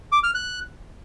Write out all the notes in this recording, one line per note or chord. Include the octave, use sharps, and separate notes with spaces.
D6
F6
F#6